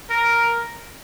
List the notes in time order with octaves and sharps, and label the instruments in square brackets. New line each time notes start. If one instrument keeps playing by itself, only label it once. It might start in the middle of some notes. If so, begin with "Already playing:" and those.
[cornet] A#4